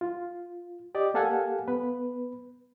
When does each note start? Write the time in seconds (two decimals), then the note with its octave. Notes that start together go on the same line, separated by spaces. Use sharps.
0.01 F4
0.95 G4 D5 D#5
1.14 A#3 G4 A4 F5 F#5 G#5
1.68 B3 B4